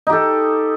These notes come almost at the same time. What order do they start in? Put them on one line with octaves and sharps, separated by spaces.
D#4 G4 A4